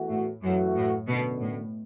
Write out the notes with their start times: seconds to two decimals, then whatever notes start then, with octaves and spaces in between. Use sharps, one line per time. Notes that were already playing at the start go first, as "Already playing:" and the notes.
Already playing: E2 E3 A3 F#4
0.09 A2
0.42 F#2 E3 A3 F#4
0.75 A2
1.07 F#2 B2 D3 B3
1.41 A2